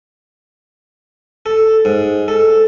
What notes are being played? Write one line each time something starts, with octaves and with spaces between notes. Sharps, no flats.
A4
G#2
A4